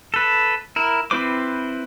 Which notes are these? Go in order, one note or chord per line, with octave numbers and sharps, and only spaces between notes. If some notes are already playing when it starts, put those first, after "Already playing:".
A4 B4
E4 A#4
C4 E4 B4 C5 D6